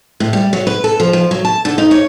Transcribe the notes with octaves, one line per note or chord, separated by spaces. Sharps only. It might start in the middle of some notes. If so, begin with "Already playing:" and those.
A2
G3
F#3
B4
A4
F3
F3
F#3
A5
D3
D#4
C#5